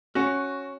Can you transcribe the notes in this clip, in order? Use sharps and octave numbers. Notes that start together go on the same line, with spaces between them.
C#4 F#4